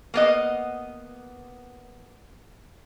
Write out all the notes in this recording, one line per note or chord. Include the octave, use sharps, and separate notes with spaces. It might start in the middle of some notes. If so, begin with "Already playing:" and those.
A#3 B3 D#5